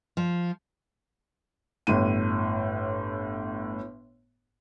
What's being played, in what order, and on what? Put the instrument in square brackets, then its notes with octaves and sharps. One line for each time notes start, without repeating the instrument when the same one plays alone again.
[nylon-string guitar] F3
[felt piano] G1 A2 D#7